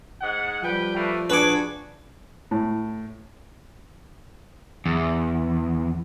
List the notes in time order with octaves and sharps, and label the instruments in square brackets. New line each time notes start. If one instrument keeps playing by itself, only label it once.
[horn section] G#2 F#5
[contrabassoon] F3 [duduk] G3 [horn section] B4 G5
[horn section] A3 A#3 B4
[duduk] D4 [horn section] F#4 G#4 [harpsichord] B4 D6
[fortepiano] A2
[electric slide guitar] E2